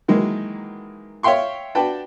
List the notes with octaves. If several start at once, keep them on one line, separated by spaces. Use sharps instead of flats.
D#3 E3 F#3 G#3 A#3
C#5 E5 F5 G5 C6 C#6
D4 F#4 B4 G5 A5